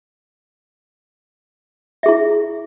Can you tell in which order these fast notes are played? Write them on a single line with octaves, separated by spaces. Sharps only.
E5 G#4 E4